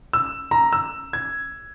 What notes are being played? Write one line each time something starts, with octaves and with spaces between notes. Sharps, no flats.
E6
A#5
E6
G#6